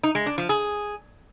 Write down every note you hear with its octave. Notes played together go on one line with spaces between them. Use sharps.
D#4
G#3
D4
F3
G#4